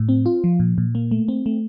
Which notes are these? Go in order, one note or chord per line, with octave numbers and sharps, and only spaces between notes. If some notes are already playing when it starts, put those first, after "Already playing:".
Already playing: A2
C4
F4
F3
A#2
A#2
A#3
A3
C4
A3